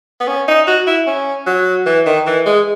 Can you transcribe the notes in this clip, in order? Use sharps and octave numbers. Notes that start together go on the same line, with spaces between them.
B3
C#4
D#4
F#4
E4
C#4
F#3
E3
D#3
E3
G#3